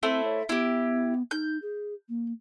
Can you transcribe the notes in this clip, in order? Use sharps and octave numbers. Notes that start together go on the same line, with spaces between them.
A3 C4 E4 C5
C#5
B3 E4 G4
D#4 G6
G#4
A#3